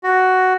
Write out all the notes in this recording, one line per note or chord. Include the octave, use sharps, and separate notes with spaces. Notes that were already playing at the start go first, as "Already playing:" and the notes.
F#4